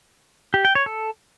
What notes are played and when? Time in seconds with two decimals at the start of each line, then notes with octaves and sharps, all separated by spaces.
0.54 G4
0.65 G5
0.75 C#5
0.86 A4